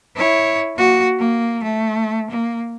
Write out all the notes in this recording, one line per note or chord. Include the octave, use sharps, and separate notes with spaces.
E4 C#5
A#3 F#4
A#3
A3
A#3